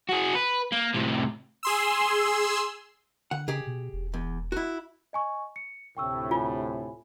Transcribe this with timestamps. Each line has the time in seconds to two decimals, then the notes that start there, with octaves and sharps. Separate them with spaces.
0.09 F#4 G#4
0.35 B4
0.72 A#3
0.94 A2 C3
1.63 G#4 C6 E6
3.31 D3 F#5
3.48 C#3 G4 G#4
3.67 B2
3.93 E1
4.14 E2
4.52 E4 F#4
5.13 D#5 G#5 C#6
5.56 C#7
5.97 D2 A2 C3 G5 C#6 E6
6.31 F4 G#5 B5